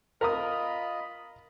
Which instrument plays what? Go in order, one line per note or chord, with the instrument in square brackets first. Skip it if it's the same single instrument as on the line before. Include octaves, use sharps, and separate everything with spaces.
[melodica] F4 D#5 B5 [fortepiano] A#4 A#5 D#6